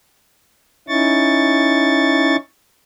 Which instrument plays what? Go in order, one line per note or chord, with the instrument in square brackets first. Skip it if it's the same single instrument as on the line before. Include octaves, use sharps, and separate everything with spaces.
[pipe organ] C#4 D#4 E4 C#6 A6